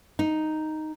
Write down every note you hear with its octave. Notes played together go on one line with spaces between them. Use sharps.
D#4